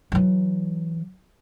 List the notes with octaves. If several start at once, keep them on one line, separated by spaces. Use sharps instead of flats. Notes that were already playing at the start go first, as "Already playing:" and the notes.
E3 F#3